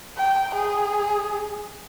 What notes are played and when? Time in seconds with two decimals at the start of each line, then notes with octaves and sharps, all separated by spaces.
0.17 G5
0.55 G#4